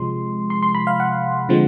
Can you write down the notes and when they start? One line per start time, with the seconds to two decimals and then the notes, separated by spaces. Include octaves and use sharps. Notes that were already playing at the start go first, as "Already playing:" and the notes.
Already playing: C3 F3 G#3 C6
0.50 C6
0.63 C6
0.75 B5
0.87 F5
1.00 F#5
1.49 D3 F3 G#3 C4